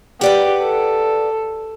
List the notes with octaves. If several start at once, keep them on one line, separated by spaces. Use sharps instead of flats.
G4 B4 D5 F#5
A4